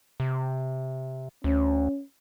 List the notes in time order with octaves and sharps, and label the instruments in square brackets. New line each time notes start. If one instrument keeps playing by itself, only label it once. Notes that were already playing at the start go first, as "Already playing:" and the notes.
[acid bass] C3
[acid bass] D2 [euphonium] C#4